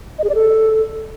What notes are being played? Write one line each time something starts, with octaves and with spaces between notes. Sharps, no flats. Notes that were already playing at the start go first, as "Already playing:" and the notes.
D#5
G#4
D5
A4